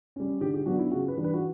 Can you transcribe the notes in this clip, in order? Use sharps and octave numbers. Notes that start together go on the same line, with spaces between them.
G3 C#4
D3 G4
G4
F#3 B3 D4 F#4
E4
C#3 F#4
B4
E3 G3 D4
B4
F#4